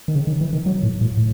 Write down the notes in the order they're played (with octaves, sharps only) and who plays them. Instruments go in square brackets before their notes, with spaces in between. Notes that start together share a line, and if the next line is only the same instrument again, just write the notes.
[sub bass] D#3
C#3
D#3
E3
D#3
F#3
A2
A2
A2